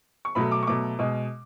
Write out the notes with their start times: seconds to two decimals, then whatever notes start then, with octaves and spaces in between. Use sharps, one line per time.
0.25 C#6
0.35 B2 F#3 A3 B5
0.51 D6
0.63 C#6
0.67 B2 F#3 A3 D6
0.99 B2 G#3